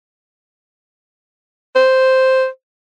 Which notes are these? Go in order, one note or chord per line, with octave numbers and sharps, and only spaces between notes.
C5